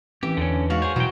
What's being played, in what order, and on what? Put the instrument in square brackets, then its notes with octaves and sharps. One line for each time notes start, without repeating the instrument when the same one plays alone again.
[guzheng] E3 [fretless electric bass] C4 C#4 [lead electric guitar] G4
[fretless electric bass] E2 [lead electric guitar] D3 C#4
[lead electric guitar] G#2 [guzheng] F#4 F5 F#5
[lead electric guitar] G#4 C#5 [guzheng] C5
[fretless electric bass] B2 [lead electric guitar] E3 G5 [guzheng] F#3